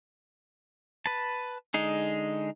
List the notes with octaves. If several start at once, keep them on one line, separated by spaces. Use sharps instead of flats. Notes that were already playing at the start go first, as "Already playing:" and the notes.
B4 A5
D3 G#3 D#4 G#4